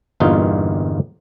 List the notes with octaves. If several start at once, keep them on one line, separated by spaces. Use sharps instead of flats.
G1 E2 G2 A#2 D#4 F4